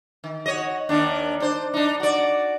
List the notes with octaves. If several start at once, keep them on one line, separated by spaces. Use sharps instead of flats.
D#3
F#4 C#5 D#5
D#2 D#3 D4
D4 C5
D4 D#4
F#4 D5